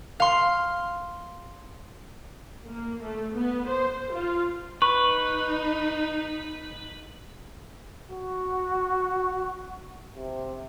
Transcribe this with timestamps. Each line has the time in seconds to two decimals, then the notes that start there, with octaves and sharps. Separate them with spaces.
0.20 F5 C6
2.67 A#3
3.02 A3
3.35 B3
3.68 C5
4.13 F4
4.82 D#4 B4 C#6
8.12 F#4
10.16 C3